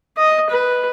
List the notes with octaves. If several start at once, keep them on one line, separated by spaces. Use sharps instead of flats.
D#5
B4